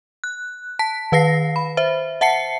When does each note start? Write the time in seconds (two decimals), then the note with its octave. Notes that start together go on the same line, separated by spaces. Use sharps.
0.24 F#6
0.79 A5 B6
1.12 D#3 B4 F5 A#6 C7
1.56 B5
1.77 C5 E5
2.21 E5 F#5 A5 C7 C#7